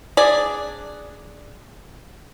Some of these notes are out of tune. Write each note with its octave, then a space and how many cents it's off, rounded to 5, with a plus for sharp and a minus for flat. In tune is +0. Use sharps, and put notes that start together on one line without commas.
D4 +0 G#4 +0 D5 +0